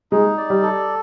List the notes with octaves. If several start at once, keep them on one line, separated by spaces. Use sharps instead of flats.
G#3 D#4
D5
G3
A4